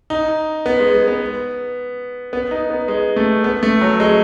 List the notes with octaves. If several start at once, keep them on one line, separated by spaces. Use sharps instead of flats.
D#4
B3
G#3
G#3
B3
B3
D#4
B3
G#3
A3
B3
A3
F#3
G#3